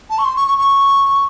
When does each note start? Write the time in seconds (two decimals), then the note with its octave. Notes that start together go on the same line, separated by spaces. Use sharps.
0.10 A5
0.18 C#6
0.25 C6
0.36 C#6
0.48 C#6
0.58 C#6